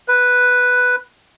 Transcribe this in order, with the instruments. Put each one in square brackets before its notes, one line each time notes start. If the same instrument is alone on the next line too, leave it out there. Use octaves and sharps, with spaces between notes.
[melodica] B4